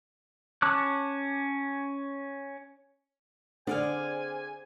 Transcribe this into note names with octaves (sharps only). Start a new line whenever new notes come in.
C#4 A5 C#6 D6 F#6
D3 C4 G#4 D5 F5 G#5